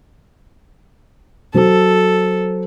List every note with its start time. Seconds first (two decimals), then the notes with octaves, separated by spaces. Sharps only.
1.54 F#3 A4 C5